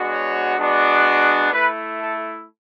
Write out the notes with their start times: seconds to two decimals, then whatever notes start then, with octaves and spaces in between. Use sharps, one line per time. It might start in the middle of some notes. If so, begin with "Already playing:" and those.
Already playing: G#3 B3 D4 F#4
0.10 C#5
0.56 G#3 B3 D4 F#4
1.52 A3 E4 B4
1.98 A4